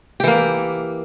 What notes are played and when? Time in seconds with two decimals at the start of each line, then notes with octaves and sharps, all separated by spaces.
0.20 G4
0.24 E3
0.27 A#3